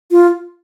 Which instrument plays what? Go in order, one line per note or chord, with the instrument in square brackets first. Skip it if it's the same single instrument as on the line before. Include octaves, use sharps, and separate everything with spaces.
[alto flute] F4